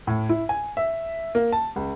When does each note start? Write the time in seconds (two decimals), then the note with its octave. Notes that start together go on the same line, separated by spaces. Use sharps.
0.07 A2
0.29 E4
0.49 G#5
0.77 E5
1.35 A#3
1.52 A5
1.76 C#2